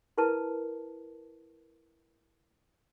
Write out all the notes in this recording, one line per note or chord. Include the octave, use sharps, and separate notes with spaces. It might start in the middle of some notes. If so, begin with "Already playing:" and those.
E4 A#4 B4 A5